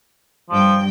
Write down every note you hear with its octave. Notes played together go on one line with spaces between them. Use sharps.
G2 F3 G5